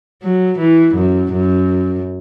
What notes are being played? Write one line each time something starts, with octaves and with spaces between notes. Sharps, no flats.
F#3
E3
F#2
F#2